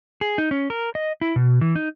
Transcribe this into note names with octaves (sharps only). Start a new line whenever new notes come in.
G#4
D#4
C#4
A#4
D#5
E4
B2
E3
D#4